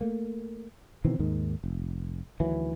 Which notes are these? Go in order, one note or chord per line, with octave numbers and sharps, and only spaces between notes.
A3 A#3
B2 D#3 E3 C4
D#2 G#2 D#3
F1
D2 D#3 E3 F#3